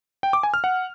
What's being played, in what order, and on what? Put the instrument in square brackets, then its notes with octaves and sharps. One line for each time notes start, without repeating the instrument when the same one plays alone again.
[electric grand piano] G5
D6
G#5
F6
F#5